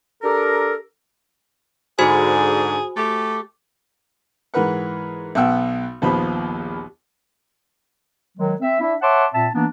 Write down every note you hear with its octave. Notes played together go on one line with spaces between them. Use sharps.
D4 G4 A4 A#4
G#2 D3 F#4 G#4 C5 G#5
A3 G4
G#2 E3 A#4 B4 F#5
B1 B2 B3 F#5 G5 E6
A#1 D#2 F3 B3 C5 B5
D#3 F#3 G#3
C4 E5
D4 E4 E5
C#5 E5 F#5 A5 C6 D6
A#2 C4 E5 A5
E3 A#3 B3 D4